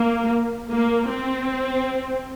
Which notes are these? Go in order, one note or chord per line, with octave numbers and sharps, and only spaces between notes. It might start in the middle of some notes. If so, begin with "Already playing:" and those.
Already playing: A#3
A#3
C4